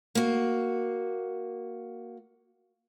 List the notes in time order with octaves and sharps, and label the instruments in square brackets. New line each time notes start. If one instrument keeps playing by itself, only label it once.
[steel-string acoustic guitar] A#3 F#4